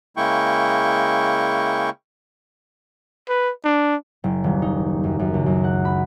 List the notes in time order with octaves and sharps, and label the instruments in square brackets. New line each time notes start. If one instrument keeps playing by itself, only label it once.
[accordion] C#3 G#3 A#3 E4 G5 C#6
[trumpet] B4
D4
[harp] F#1
D#1
D#4
F#2
F#2
C#2
F#2
F#5
B5